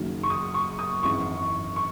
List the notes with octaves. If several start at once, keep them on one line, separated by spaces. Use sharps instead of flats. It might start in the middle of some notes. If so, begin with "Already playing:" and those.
Already playing: F#1 F#2 D#3 F#3
C#6
D#6
C#6
D#6
G#1 F#2 E3 C#6
C#6